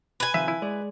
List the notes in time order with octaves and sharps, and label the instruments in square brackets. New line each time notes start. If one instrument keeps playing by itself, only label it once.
[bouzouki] B4 G#5
[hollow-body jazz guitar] C3 D#3 F3 [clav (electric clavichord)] E5
[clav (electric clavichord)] E4
[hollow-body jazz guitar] G#3 D5